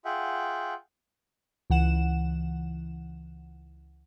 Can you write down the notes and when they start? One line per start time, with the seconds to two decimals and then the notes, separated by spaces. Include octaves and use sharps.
0.05 F4 G#4 E5 F#5 G5
1.70 C#2 E3 F#5 E7